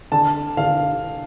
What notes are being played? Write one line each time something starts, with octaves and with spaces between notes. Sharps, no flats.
D3 A5
D3 F5